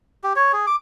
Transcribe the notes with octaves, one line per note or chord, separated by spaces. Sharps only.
G4
C#5
G#4
D6